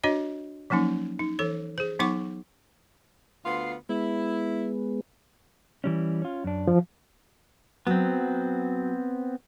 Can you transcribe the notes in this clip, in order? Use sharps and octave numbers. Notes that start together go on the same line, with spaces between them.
D4 F#4 C#5 D#5
F3 F#3 A#3 C#4 D#4
D#4
E3 A4 C#5
G#4 C5
F#3 B3 D#4 F#5 C#6 D6
D2 B3 F4 C6
G#3 B3 E4
E3 G3 C#4
C#4 F4
F#2 D4
F3
F#3 B3 C4